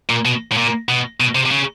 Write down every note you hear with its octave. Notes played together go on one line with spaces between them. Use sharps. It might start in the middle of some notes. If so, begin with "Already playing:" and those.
A#2
B2
A2
A#2
B2
B2
C3
C3
C#3